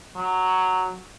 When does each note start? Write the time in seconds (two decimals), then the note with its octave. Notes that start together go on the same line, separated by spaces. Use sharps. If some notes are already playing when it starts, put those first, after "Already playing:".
0.16 F#3